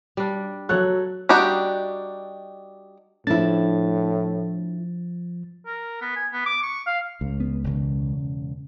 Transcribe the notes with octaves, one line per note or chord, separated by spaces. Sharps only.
G3 D4
F#3 A4 C#5 F#5 F#6
G3 D4 D#4 F#4 G4
A2 F3 D4 E4 A6
A#4
B3
G#5
B3
D6
C#6
F5
C#2
B3
E1 C#3